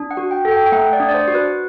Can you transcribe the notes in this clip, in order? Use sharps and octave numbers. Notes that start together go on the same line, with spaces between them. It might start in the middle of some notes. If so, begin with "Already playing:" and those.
Already playing: D4
F#5
F#4
G5
A4
G5
G5
A3 F#5
D5
D4
D5
C5
F#4
B4